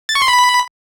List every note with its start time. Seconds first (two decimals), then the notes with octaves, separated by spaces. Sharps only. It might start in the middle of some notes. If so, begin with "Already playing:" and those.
0.09 A6
0.15 C#6
0.22 C6
0.28 B5